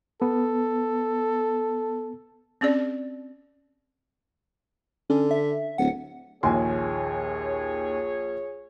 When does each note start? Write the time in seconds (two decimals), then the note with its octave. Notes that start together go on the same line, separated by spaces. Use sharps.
0.22 B3 A4
2.61 C4 C#4 G#4 D5
5.10 D3 C#4
5.31 E5
5.78 D1 F#5
6.43 A#1 D#2 G#4 C#5 G#5 C6